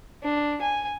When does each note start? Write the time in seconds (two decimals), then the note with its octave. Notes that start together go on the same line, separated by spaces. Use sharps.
0.23 D4
0.61 G#5